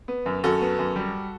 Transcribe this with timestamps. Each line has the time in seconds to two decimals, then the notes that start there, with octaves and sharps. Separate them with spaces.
0.08 B3
0.26 F#2
0.43 F#2 F#4 A4
0.61 B3
0.79 F#2
0.96 G3